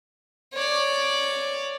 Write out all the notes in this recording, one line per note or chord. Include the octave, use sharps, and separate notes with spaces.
C#5 D5